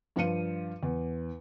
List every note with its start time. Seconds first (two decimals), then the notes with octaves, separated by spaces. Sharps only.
0.16 G2 F3 F5 C#7 D#7
0.83 E2